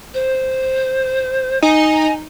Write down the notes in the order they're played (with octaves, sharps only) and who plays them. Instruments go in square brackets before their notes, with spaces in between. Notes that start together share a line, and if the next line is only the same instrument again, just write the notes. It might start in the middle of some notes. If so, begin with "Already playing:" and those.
[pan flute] C5
[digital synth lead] D#4 [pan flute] G#5